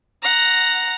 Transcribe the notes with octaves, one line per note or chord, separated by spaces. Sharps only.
F#5 A#5